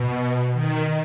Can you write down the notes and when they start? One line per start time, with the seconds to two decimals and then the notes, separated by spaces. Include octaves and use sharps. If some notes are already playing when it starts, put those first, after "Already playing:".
Already playing: B2
0.53 D#3